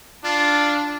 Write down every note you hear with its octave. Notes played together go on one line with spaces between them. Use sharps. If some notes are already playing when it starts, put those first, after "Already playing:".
D4 F4